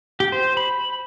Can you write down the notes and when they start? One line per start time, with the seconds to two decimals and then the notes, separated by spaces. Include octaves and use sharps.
0.20 G4
0.32 C5
0.57 B5